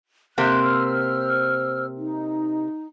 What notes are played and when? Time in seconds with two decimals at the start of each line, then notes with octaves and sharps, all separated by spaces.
0.38 C3 A#3 C4 F#6
0.62 C5 E6 F6
1.97 D#4